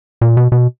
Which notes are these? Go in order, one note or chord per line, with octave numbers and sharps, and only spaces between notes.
A#2
B2
B2